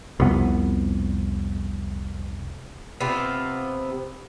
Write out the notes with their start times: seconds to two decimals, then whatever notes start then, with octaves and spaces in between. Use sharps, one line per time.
0.20 C2 F2 C3 B3
3.00 C3 B3 C4 F4